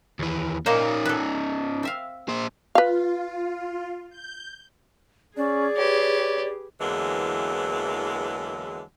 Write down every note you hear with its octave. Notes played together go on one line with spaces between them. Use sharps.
D#2 E3
A#2 A#3 C#4 D#4 C5
A4 B4
C4 E5 F5
A#2 C5
F4 B4 F5
G6
C#4 G#4 D5
G4 B4 C#5
E2 D3 E3 F#3 G#3 A#3